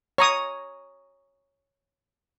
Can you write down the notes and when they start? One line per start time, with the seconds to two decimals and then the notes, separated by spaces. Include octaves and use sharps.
0.18 C#5 A#5 D#6